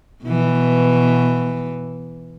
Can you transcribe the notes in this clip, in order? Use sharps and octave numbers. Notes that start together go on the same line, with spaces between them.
B2 E3